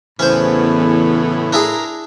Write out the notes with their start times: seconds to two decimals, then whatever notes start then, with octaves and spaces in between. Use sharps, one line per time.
0.19 E2 A2 C#3 E3 B3 C#4 C5
1.53 D4 E4 G#4 A#4 A#5